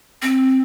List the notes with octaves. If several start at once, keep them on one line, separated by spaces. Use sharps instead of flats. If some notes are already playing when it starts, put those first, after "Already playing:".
C4